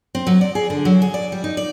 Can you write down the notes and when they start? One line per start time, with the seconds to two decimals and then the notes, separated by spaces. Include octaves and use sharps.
0.15 C4
0.27 F#3
0.41 D5
0.55 G#4
0.70 D3
0.85 F#3
1.02 G#4
1.14 D5
1.32 G3
1.44 D#4
1.57 D5